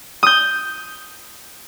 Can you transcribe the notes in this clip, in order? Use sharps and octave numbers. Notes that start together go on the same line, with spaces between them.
D#6 G6